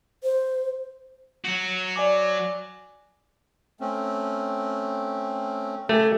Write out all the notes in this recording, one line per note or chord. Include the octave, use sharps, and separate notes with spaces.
C5
F#3 F#4
D5 G#5 D6
A3 C4 C#4
C#3 A3 G4 G#5